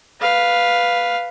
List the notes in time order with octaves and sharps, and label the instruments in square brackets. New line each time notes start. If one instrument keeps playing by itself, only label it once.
[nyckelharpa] B4 F5